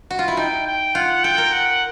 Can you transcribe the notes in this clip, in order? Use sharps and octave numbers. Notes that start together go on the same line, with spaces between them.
F#4
F4
E4
D#4 G5
G5
F4 F#5
A4 G5
A#4
F#5